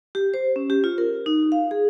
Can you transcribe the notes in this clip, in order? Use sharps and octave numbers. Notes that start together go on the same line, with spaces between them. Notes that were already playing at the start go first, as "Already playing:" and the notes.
G4
C5
C#4
G4
F4
A#4
D#4
F5
G#4